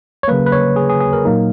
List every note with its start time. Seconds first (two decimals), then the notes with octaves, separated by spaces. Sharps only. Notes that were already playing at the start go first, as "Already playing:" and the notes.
0.23 C#5
0.28 C#3 F#3 A#3 B4
0.46 B4
0.52 C#5
0.76 G#4
0.89 G#4
1.01 G#4
1.13 A#4
1.25 A#2 F#3 A#3 D#4